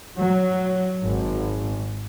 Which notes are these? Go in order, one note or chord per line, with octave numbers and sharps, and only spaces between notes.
F#3
G#1